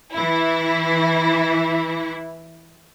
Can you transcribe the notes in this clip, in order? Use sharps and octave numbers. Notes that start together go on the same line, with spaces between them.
E3 E4